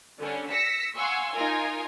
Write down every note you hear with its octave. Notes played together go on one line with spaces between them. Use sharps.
D3 G3 C#4 D4
E6 A#6 B6 C#7
F5 F#5 G#5 C6 C#6 E6
D#4 F4 A#4 G#5